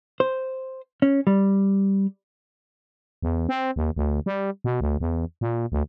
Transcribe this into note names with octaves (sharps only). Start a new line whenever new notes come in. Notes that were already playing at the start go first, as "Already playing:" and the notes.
C5
C#4
G3
E2
C4
D#2
D2
G3
B2
D2
E2
A#2
D2